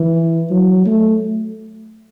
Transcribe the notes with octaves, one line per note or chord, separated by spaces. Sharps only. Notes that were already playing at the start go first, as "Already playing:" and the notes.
Already playing: E3
F#3
A3